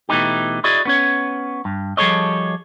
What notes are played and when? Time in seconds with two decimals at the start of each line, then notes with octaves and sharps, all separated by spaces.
0.09 B2 E3 A3 D#4 G4
0.64 E4 F#4 G#4 D5 D#5
0.85 B3 C#4 C#5
1.65 G2
1.97 F3 G3 G#4 A4 C#5 D#5